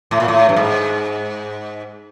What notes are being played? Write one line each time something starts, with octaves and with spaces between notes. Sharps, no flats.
A2
A#2
A2
G2
G#2